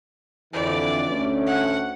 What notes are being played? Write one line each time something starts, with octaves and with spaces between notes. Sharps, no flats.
F2 D3 E3 D5
D2 A3 C#4
F#5